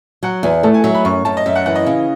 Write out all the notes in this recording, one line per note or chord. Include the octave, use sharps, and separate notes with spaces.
F#3 F#5
E2 G#5
A3 A5
G#5
F#3 E5
B5
F#2 C#6
F#2 A5
D#5
F#2 E5
F#5
E3 F#5
D#5
C#3